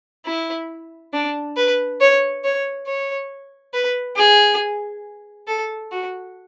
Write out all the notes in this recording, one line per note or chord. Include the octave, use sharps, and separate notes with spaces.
E4
D4
B4
C#5
C#5
C#5
B4
G#4
A4
F#4